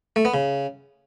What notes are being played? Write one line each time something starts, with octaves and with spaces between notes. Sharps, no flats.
A3
B3
C#3